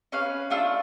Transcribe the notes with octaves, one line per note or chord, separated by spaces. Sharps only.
C#4 B4 F5
A3 D4 F4 E6